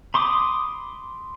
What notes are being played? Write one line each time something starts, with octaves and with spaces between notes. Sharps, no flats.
B5 C6 D6 D#6